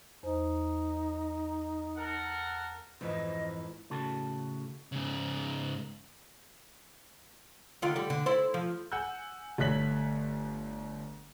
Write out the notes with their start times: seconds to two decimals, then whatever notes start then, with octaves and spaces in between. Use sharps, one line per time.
0.23 E2 D#4 C5
1.97 A4 A#4 F#5
3.01 F2 G#2 E3 D#5
3.90 A2 C#3 F#4 A4
4.92 G#2 C#3
7.82 D3 D#3 F4
7.96 D3 G3
8.10 D3
8.26 E4 A4 C5
8.54 F3
8.92 F#5 G#5 E6 F#6 G6
9.58 G1 A3 C#5 F#6 B6 F#7